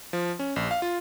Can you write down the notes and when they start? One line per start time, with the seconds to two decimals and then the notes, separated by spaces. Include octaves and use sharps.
0.13 F3
0.39 C#4
0.56 A#1
0.71 F5
0.82 F4